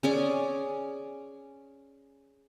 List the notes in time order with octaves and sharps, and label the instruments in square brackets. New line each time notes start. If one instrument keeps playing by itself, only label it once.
[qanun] C#4 G#4 D5